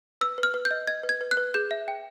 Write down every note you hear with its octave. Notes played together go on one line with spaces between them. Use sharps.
B4 E6
B4
F6
B4
G6
D#5
D#5 G#6
B4
G#6
B4
F#6
B4
G#4 G6
E5
G5